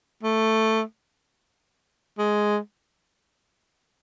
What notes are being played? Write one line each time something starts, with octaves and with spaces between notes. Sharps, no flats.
A3
G#3